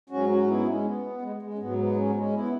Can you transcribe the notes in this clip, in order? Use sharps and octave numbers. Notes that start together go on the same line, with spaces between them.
G#2 F#3 C#4 F#4
C#4 F#4
B3 E4
G#3 C#4
B3
G#3
G#3
C#4
G#2 F#3 B3
B3
G#3 C#4
B3
G#3 C#4
B3 E4